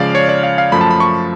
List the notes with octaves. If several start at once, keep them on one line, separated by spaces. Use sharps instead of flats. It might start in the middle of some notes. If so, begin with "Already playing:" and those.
Already playing: C#3 F3 G#3 D5 F5
C#5
D5
F5
F5
F#2 F3 A3 B5
A5
B5
C#6